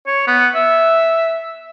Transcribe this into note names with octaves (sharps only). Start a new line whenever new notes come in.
C#5
B3
E5